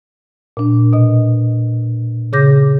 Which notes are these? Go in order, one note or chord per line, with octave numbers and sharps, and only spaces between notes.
A#2 D4
B2 D#5
C#3 G#4 D6 G6 A#6